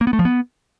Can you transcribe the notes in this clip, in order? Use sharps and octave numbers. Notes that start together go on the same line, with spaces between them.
A#3
B3
A3
F3
B3